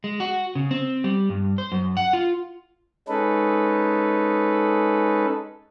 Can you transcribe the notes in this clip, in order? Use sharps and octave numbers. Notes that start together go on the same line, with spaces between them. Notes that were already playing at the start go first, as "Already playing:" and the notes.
G#3
F#4
C#3
C4
G3
G2
C5
F#2
F#5
F4
G#3 C#4 D#4 A4 B4